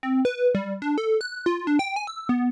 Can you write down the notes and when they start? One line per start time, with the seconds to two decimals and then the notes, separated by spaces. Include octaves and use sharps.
0.03 C4
0.25 B4
0.55 G3
0.82 D4
0.98 A4
1.21 F#6
1.46 F4
1.67 D4
1.79 G5
1.96 G#5
2.07 E6
2.29 B3